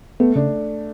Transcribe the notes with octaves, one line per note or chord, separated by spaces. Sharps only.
A3 B3
C#3 D4